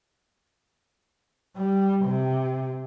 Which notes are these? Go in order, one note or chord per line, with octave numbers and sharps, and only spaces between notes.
G3
C3